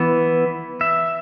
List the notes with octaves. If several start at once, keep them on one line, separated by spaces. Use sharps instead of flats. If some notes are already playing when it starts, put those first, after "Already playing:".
Already playing: E3 B3
E5